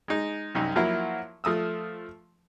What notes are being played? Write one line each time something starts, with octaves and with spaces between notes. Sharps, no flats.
G#3 D#4
C2 F#2 D#4
F3 F#3 A#3 E4
F3 A3 D#6 E6